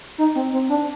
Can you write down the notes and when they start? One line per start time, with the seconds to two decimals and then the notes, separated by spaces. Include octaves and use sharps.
0.18 D#4
0.36 C4
0.53 C4
0.70 D4